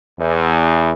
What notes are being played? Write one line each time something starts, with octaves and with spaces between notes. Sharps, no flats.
E2